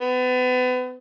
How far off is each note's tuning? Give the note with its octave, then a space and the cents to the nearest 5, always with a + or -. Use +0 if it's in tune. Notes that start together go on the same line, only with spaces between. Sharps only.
B3 +35